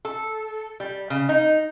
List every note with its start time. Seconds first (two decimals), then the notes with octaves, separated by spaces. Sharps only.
0.05 A4
0.80 G3
1.10 C#3
1.29 D#4